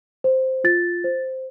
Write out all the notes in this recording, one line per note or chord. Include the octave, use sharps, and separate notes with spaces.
C5
F4 A6
C5